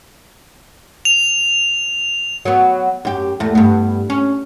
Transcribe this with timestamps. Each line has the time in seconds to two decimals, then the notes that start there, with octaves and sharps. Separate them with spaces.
1.05 F7
2.45 F#3 B3
3.05 F#2 G4
3.40 E2 A3
3.55 G2 B3
4.10 C#4